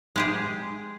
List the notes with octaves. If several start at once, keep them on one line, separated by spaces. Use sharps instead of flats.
G#3 G4 G#4